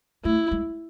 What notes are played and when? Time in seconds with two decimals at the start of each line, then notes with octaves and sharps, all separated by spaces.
0.25 A3 E4
0.51 G#3